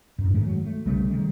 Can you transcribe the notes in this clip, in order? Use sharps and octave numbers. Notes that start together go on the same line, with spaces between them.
F#2 A2
G#2 D#3 G#3 A3
F#3
A3
B1 C#3 G3 A3
D#3 G3 G#3